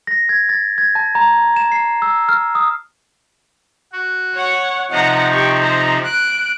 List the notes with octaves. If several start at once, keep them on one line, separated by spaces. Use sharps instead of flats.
A#6
G#6
A6
G#6
A5
A#5
E7
C7
E6
F6
D#6
F#4
C#5 F#5
C3 F3 D#4 F#5 A#5
G4 C#6
C5 A#5
F#6 D7